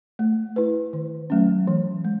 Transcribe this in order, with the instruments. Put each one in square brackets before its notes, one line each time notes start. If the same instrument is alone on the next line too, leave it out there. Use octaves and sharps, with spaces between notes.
[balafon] A3
E4 B4
D#3
F#3 A3 C#4
E3
G#3